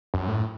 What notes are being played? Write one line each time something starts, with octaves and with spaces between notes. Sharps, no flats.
F#2
A2